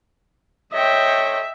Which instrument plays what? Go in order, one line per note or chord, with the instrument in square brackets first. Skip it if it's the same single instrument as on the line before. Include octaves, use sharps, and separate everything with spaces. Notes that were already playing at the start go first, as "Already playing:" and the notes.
[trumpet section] A4 C5 C#5 [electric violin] D#5 G5 [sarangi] E5